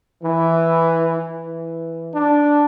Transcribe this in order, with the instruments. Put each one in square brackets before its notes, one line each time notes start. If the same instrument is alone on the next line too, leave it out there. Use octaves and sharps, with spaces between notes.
[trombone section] E3
E3
D4